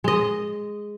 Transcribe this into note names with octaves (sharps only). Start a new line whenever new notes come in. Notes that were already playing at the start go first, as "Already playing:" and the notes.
G#3 D#5